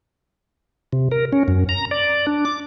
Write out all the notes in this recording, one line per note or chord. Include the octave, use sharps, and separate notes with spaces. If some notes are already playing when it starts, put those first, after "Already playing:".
C3
A#4
C#4
F#2
A#5
D5
D4
D6